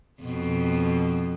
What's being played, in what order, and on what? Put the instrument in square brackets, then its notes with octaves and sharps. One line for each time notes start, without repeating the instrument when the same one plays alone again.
[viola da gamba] F2 B2